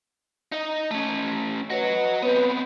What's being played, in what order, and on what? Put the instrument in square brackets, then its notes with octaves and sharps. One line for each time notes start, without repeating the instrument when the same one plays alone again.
[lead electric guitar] D#4 D#5
A3 C#4
[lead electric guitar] F#4 C#5 [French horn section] B4 D#5
[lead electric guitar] B3 C4 [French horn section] B4